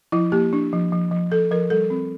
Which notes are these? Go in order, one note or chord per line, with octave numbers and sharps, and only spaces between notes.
F3 E4
A#3 G4
D4
F3
F3
F3
F3 A4
F3 A#4
G3 A4
C4